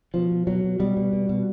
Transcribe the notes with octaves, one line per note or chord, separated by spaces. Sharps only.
B2 F3
B2
B2 F#3
B2
B2 G3
B2
B2
B2